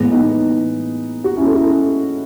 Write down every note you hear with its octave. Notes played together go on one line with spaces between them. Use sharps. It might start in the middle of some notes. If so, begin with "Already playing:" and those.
Already playing: A2 E3 G#3 B3
B3 D#4
F#4
C#4 E4
A4
E4 G#4